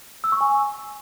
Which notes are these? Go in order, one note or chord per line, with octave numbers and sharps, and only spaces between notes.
E6
C#6
G#5